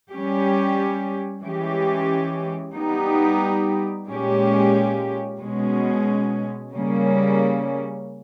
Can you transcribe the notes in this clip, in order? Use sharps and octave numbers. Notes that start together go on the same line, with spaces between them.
G3 C#4 G4
E3 G#3 C#4 G4
G3 B3 D#4 G4
A#2 G#3 C#4 G4
B2 G#3 C#4
C#3 G3 A#3 C#4